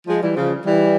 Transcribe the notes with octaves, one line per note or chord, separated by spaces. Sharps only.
F3 G#3
E3 G3
C#3 F3
E3 G3